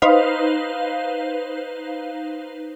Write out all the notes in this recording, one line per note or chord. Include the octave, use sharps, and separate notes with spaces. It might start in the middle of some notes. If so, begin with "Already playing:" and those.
D#4 B4 C5 F5